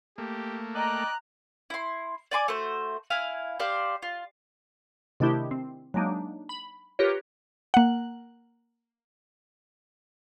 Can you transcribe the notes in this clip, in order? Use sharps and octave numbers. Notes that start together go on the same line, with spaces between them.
A3 A#3 G4
D5 D#5 G5 A#5 F#6
E4 C6
D5 G#5 C6 D6
A3 F#4 C5
E4 F5 G#5
G4 C5 D5 F5
F4
C3 D#3 A3 D4 E4 G4
C4
F#3 G#3 A#3 D4 D#4
B5
F4 G4 A#4 B4 C#5
A#3 F#5